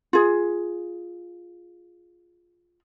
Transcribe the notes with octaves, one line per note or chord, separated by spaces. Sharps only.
F4 G#4